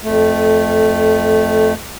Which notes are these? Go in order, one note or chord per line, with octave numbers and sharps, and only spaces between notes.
F2 A3